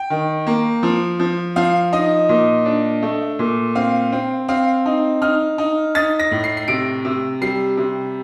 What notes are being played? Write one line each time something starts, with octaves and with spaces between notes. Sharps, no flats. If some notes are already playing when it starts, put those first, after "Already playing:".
Already playing: G5
D#3
A#3
F3
F3
F3 F5
D#4 D#5
A#2
D4
A3
A#2
C4 F5
C4
C4 F5
D#4
D#4 F6
D#4
D#4 A6
A#6
A2
C7
C7
C3 D7
C3
G3 C7
C3